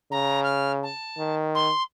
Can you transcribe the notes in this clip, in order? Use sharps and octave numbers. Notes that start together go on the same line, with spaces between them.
C#3 A#5
F6
A5
D#3
C6